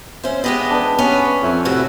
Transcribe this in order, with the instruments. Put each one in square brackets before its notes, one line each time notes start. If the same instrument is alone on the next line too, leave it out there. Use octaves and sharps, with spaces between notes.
[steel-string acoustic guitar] C#4 C5 [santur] E5
[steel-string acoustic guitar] G#3 G4 D#5 [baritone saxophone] B3
[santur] D4 B4
[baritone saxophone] B3 [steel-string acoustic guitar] C#4
[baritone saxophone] F2 [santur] E5
[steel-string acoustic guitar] A2 E4 F#4 [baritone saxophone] C3